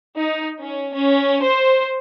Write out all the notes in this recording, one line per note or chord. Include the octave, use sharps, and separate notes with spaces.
D#4
C#4
C#4
C5